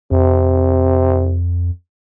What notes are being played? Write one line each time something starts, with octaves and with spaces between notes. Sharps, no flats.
F2 C3